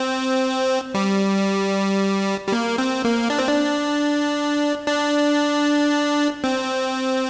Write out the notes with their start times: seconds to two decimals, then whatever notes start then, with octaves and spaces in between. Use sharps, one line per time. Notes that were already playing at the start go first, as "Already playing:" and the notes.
Already playing: C4
0.94 G3
2.47 G3
2.52 A#3
2.78 C4
3.05 A#3
3.30 D4
3.38 C4
3.48 D4
4.87 D4
6.44 C4